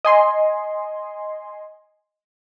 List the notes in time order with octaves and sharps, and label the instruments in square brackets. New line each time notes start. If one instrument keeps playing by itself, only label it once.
[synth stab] D#5 G#5 C6